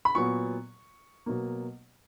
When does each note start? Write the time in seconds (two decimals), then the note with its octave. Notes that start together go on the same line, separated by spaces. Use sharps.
0.05 B5
0.15 A#2 F#3 B3 C#6
1.26 B2 F#3 A#3